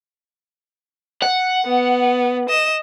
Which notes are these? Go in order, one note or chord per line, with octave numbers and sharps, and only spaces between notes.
F#5
B3
D#5 E7